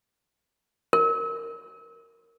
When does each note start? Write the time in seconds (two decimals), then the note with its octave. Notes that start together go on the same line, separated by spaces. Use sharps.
0.93 A#4